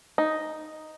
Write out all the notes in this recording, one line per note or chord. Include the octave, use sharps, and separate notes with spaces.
D#4